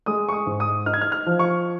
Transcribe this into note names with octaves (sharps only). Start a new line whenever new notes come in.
G#3 D#6
C#6
D#6
G#2
D#6
D#4 F6
G#6
F6
F6
F3
C#6